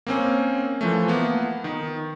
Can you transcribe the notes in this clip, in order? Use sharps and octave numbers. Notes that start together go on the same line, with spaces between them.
A#3 C4 C#4
E3 F3 A3
A#3 B3
D#3